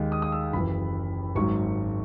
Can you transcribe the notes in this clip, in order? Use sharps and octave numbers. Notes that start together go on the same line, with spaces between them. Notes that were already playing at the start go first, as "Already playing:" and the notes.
Already playing: D#2 D#3 G#3
D#6
D#6
E6
F#1 F#2 E3 B5
G#1 G#2 F#3 C#6